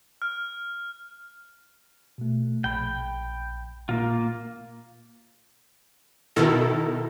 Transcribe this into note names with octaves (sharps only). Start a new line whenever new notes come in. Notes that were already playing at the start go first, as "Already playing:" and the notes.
F6
B2 A3
A#1 G5 B5
A#2 A#3 F4
B2 D#3 E4 A4 A#4